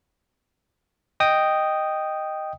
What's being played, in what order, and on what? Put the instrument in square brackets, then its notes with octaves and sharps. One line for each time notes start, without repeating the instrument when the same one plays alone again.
[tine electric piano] D#5 G5 D#6